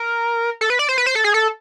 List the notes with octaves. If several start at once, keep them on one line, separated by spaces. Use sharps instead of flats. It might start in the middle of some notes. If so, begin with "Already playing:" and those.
Already playing: A#4
A4
B4
D5
C5
B4
C5
A4
G#4
A4